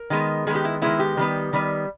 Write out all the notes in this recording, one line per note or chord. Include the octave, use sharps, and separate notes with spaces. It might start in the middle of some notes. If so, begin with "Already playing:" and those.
Already playing: A#4
D#3 G#3 B3
D#3 G#3 B3 G#4
G4
E4
D#3 G#3 B3 E4
G4
D#3 G3 B3
D#3 G3 B3